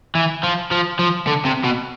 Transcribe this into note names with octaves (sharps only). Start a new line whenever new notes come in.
E3
F3
F3
F3
D3
C3
B2